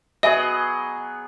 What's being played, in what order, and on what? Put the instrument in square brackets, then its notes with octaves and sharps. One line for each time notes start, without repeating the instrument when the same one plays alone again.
[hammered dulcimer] F#3 B3 G#4 [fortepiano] D#5 [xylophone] E5 G#5